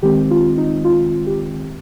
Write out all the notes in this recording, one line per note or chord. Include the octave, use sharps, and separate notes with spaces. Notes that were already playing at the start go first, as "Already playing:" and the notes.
D#3 G#3 C4 G4
F4
D#4
F4
G4